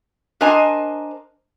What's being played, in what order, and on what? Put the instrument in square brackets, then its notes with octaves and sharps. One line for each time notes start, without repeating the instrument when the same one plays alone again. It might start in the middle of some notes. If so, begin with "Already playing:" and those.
[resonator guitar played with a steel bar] D4 A#4 C5 D#5 G#5 A#5